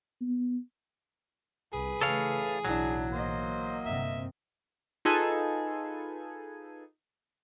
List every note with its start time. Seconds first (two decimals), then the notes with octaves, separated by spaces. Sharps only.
0.21 B3
1.73 C2 G#4 B4
2.01 C#3 E3 A3 A4 C#5 F5
2.65 B1 A2 E3 F#3 D4 E4
3.12 A#3 C5 D#5
3.86 G1 C3 C4 E5
5.05 D#4 F4 G#4 A4 B4 G#5